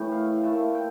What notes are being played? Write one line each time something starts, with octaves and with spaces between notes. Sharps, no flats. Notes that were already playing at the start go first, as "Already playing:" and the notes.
Already playing: A2 E3 A3 G5
F5
A#2 A3 E4 A5
G5